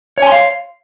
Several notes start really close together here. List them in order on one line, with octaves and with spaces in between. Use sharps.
C#5 G#5 C6 F5